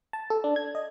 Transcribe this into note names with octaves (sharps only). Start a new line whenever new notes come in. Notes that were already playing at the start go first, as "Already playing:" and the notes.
A5
A4
D4
G#6
D#5